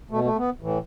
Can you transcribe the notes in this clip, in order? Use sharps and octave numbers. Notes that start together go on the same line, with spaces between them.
B2 A3
A3
B3
A2 E3